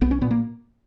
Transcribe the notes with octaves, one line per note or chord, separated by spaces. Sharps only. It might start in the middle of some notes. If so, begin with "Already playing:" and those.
B1 B3
C#4
A#2 B3
A#3